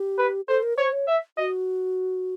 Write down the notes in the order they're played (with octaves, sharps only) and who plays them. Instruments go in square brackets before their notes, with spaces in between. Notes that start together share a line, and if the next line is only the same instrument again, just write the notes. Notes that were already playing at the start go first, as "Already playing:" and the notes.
Already playing: [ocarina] G4
[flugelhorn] B4
[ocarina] A4 [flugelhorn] C5
[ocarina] A#4
[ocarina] C5 [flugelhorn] C#5
[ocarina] C#5
[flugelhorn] E5
[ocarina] F#4 [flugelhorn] D#5